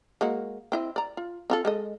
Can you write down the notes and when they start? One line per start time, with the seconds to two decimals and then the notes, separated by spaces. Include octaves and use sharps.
0.21 G#3 A#3 F#4
0.72 C4 E4 D#5
0.96 D5 A#5
1.17 F4
1.50 C4 F4 A4
1.65 G#3 A4 D#5